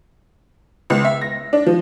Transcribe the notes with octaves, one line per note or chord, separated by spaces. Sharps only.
C#2
E5
A#6
D4
F3